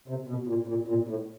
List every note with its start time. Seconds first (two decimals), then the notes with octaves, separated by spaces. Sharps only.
0.08 C3
0.27 B2
0.47 A#2
0.68 A#2
0.88 A#2
1.08 A2